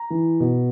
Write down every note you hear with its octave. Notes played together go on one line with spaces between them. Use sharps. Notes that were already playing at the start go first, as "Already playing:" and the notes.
Already playing: A#5
E3
B2